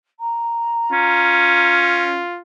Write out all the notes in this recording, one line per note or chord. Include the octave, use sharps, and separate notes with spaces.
A#5
C#4 F4